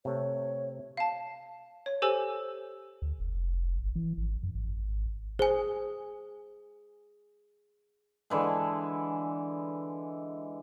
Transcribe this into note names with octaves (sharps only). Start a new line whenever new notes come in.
C3 A3 C#5
F5 A5
C#5
G4 A4 C5 G#5 E6
D2
F1
G#1
E3
G#1
F#2
G#1
G#4 C5 G#5
D3 E3 G#3